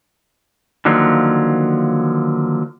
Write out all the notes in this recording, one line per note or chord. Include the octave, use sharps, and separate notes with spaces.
D3 D#3 F3 F#3 A#3